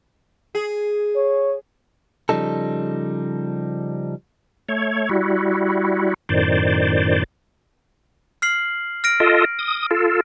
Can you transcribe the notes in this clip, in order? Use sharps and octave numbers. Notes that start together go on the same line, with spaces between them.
G#4
C#5
C#3 F3 G3 D#4 A4
A3 C#5
G3 E4 F#4
F#2 A2 D#3 C5 D5
F6 C7 F#7
F6 A#6 D7
F4 A4 D#5
D#6
F4 A4